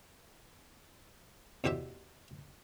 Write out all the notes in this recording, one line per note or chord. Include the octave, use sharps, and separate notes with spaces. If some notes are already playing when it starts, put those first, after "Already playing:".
E2 B2 G4 C5 E5